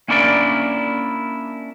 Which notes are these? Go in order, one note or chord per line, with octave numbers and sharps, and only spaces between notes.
A#3 C#4 D4 E4 A#4 D5